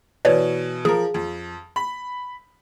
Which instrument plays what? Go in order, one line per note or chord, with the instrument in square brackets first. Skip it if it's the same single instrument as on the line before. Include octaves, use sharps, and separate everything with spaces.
[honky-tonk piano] B2 E3 [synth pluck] B4 C#5 D5
[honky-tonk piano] F3 A#4 [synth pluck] G#4
[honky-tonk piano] F2
B5